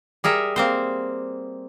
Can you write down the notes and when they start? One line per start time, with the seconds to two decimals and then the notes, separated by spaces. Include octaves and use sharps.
0.24 G3 G#4 A#4 E5
0.56 A#3 C4 C5